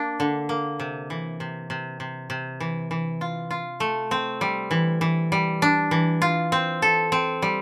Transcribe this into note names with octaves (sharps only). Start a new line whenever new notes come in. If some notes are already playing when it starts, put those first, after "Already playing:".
Already playing: A#3 D4
D3
A#3
C3
E3
C3
C3
C3
C3
E3
E3
F4
F4
A3
C4
G3
E3
E3
G3
D4
E3
F4
C4
A4
C4
G3